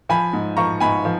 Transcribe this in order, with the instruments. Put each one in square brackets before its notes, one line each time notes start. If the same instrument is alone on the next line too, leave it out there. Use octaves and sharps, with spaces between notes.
[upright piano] F3 G#5 B5
G#2
F3 A#5 C#6
G#2 G#5 B5
F3